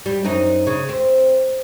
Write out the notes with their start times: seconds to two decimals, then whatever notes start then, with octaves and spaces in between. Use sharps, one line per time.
0.06 G3
0.24 F#2 C4 D#4
0.67 C#3
0.89 C4